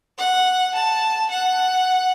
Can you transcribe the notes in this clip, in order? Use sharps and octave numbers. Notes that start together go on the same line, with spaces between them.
F#5
A5
F#5